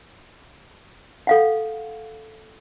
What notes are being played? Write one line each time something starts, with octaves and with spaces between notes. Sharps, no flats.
A4 F5 F#5